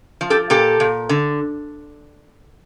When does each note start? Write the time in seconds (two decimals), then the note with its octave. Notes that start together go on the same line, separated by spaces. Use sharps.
0.21 F3
0.30 G4 A4
0.50 A#2 G4 A4
0.80 A#2
1.09 D3